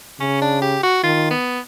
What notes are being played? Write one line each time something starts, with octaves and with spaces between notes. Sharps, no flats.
C#3 C#4
D4
G4
F#4
D#3 F4
B3